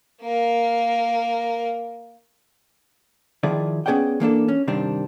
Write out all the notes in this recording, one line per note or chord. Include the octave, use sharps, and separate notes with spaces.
A#3 A#4
D#3 F3 E4 G#4 D5
B3 C#4 G#4 D5 F#5 G5
E3 A#3 D4 A4
C#4
G2 C3 D#3 G3 C4 D4